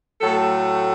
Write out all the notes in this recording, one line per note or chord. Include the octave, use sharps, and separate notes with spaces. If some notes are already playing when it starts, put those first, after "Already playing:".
A2 F#3 A3 A4